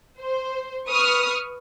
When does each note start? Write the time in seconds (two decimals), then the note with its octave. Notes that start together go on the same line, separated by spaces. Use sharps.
0.20 C5
0.89 B4 C#6 D#6 F6